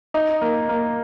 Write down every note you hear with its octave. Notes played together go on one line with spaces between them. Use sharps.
D#4
A#3
A#3